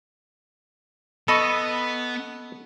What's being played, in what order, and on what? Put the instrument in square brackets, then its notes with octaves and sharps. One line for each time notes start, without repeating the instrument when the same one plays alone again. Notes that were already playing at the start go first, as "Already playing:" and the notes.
[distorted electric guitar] B3 [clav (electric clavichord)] A4 D#5 [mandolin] B5 C#6